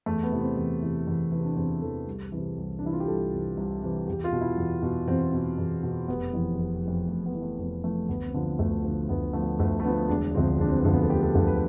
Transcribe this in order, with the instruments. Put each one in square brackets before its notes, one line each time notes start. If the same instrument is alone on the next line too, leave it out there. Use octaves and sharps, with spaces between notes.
[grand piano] E2 A3
B3
C3 E3
C4
E2
C3 E3
E2
C3 E3
D4
E2 C4
C3 E3 A4
C2
C3 E3
C2
D4
C3 E3 E4
F4
G4
C2 A4
C3 E3
C2
C3 E3
E2 G4
F4
B2
E4
E2
B2
E2 C4
B2
E2
B2
F1 B3
F2 E3
F1
F2 E3
F1 A3
B3
F2 E3
A3
F1 B3
F2 E3 A3
D2 B3
C4
D3 F3
D2 A3
D3 F3
D2 B3
D3 F3 A3
B3
D2 A3
A3
D3 F3 B3
B3
E1 D4
D2 D3 F3 C4
E1 D4
C4
B3
D2 D3 F3
B3
A4
E1 G4
A4
D2 D3 F3 A4
B4